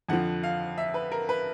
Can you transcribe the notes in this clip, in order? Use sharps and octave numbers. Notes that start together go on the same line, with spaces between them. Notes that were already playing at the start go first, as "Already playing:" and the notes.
F2 D3 F3 F#5
F5
E5
B4
A#4
B4